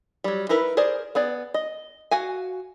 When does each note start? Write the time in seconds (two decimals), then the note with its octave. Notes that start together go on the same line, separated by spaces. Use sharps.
0.24 F#3 G3
0.49 D#4 E4 A#4 B4
0.77 G#4 A#4 C5 D5
1.15 B3 G#4 D5
1.54 D#5
2.11 F#4 F5 G#5